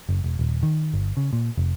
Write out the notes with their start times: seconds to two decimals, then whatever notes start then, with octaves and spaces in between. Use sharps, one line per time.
0.09 F#1
0.24 E1
0.39 D#1
0.63 D#3
0.94 G1
1.17 C#3
1.33 A#2
1.57 F1